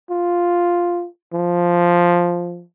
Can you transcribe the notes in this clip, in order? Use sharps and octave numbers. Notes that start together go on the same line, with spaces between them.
F4
F3